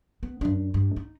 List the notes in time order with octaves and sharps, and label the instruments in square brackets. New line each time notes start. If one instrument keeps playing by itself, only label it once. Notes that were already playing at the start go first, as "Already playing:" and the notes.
[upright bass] B3
F#2 D4
G2
D#4